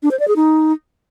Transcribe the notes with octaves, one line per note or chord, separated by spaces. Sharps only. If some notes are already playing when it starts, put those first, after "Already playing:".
D4
C5
D5
G#4
D#4